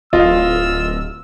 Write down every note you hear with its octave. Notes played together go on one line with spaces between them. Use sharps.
D1 F4 D#5 E6